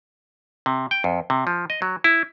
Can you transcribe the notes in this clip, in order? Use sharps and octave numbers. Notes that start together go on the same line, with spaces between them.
C3
G5
F2
C3
F3
D#5
F#3
E4